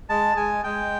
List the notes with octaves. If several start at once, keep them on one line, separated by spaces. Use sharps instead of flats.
G#3 A5
G#3 G#5
G#3 G5